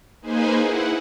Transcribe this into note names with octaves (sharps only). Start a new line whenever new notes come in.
A#3 D#4 G#4 B4 C5 G#5
E4 F#5